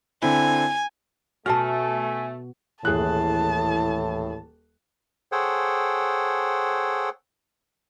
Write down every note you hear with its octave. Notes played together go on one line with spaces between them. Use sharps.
D3 C4 E4 G#5
B2 A3 F#4 G#5 A5 F6
D#1 A2 E3 G#4 A5 F#6
G#4 A4 C5 C#5 F#5 G5